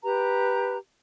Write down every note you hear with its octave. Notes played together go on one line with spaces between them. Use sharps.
G4 B4 A#5